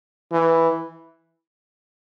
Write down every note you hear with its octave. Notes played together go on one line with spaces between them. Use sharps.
E3